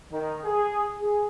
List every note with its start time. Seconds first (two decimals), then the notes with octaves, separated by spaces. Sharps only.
0.12 D#3
0.44 G#4
0.99 G#4